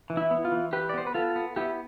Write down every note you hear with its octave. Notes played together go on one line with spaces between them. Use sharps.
E3
E4
B3
F4
E3
E3 G4 B4
D5
B3 C5
B4
B3 F4 A4
B3
B3 E4 G4